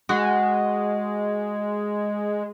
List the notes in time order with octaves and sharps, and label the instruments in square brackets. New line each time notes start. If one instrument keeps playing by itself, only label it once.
[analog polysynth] G#3 [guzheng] F#4